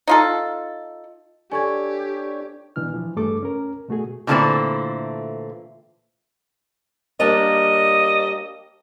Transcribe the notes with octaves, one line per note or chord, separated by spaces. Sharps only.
D#4 F4 A4
D4 G4 A4 C#5 D5 G#5 C#6 G#6
B2 E3 D4 F6
E3 F3
G2 A3 D4 G#4 A4 D6
C#4 A#4
B2 A3 F#4 G#4
A#2 D3 E3 A3 C4 E4
G3 A#3 D4 D#5